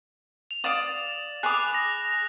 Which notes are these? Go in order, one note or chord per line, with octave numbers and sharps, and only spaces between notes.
F7
D5 F5 D#6 A6 E7 F#7
G#4 B5 D6 D#6 F#6
A#6